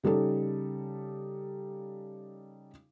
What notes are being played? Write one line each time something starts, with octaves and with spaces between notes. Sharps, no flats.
C#3 G3 D#4 A4